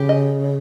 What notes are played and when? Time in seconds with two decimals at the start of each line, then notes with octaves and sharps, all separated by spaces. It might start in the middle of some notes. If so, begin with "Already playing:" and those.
Already playing: C#3 G4
0.09 D#5